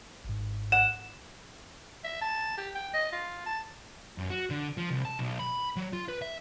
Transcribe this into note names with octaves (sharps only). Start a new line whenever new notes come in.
G#1 G#2
F#5 E7
E5
A5
G4
G5
D#5
F4
A5
F#2
F#4
D3
F3
C2
A5
B1
B5
F#3
F4
B4
E5